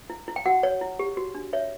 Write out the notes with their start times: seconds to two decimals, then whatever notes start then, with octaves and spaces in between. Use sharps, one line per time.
0.10 E4
0.28 E4
0.36 G5
0.46 F#4 F#5
0.63 C#5
0.81 E4
0.99 G4
1.17 F#4
1.35 D4
1.53 C#5 E5